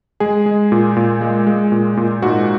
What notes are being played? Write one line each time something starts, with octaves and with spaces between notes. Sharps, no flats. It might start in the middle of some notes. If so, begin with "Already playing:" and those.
G#3 G#4
G#3
A#2
A#2
G#3
G#3
A#2
A#2
G#2 F#4